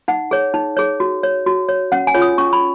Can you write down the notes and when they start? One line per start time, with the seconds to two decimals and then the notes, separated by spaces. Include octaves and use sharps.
0.08 D#4 F#5
0.31 G#4 C#5
0.54 D#4
0.77 G#4 C#5
1.00 F#4
1.23 C#5
1.46 F#4
1.69 C#5
1.92 C#4 F#5
2.07 G#5
2.14 F4 G#4 C#5
2.22 D#6
2.38 C#4 C#6
2.53 B5